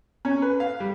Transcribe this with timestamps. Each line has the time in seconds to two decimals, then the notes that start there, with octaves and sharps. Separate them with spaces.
0.25 C#4
0.42 B4
0.60 F5
0.80 G3